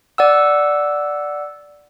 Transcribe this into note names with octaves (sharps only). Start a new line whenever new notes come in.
D5 F#5 E6